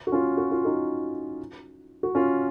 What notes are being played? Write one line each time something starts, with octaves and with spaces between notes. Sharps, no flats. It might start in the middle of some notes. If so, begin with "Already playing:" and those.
F#4
C#4 F4
F#4
F4
D#4 F#4
F#4
C#4 F4